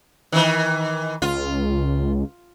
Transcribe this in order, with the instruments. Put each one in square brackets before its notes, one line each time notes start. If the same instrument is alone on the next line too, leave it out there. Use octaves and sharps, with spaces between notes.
[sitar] D#3 E3
[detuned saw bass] C#2 [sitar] F4